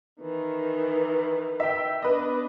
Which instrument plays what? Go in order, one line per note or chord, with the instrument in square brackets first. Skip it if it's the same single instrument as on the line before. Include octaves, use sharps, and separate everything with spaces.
[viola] D#3 E3
[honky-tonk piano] E5 G5
[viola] B3 D4 [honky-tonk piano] B4 D#5